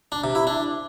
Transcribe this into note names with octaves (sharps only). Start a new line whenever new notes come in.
D4
C3
E4
D4